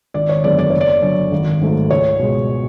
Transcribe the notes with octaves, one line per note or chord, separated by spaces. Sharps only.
G#1 D5
C#5
F#2 D3 G#3 B3 D5
D5
F#1 C#5
D5
F#2 D3
G#1
G#2 F#3 A3
C#2 C#5
B2 G#3